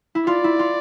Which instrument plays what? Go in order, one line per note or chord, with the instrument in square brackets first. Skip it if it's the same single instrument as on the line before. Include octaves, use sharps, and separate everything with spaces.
[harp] E4
[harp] F4 [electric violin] D5
[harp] E4
F4